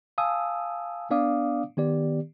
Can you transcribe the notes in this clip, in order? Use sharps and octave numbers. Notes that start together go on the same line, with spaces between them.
F5 G#5 A5 D#6 E6
B3 D4 D5 F5 D6 D#6
D#3 B3 G4 D5